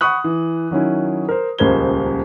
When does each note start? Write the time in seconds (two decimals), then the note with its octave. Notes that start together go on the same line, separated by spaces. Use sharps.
0.01 F#5 B5 C#6 D#6 F#6
0.24 E3
0.71 D#3 F#3 C#4 E4
1.29 A#4 C5
1.59 D#1 C#2 A#4 C5 G#6 G7